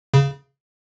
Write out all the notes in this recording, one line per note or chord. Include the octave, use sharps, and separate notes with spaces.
C#3